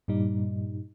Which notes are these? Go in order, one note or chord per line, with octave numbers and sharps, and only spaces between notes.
G2 A#2 G3 D#4